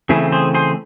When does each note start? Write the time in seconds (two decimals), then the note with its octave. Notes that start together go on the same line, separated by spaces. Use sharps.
0.09 C#3 E3 A3 C4 E4 G#4
0.32 G#4 C5
0.55 G#4 C5